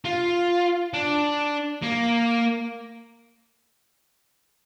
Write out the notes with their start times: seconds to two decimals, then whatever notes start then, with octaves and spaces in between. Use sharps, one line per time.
0.05 F4
0.93 D4
1.82 A#3